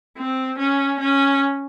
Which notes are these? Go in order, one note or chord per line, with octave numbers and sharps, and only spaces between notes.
C4
C#4
C#4